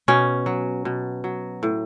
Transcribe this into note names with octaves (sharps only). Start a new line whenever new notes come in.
B2 C#4
F#3
B2
F#3
A2